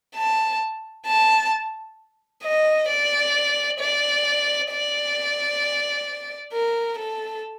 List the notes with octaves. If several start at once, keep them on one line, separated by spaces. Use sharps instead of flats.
A5
A5
D#5
D5
D5
D5
A#4
A4